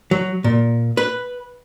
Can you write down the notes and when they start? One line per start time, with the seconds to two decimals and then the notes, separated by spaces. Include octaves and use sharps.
0.11 F#3
0.44 A#2
0.97 B4